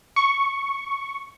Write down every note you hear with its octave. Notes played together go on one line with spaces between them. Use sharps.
C#6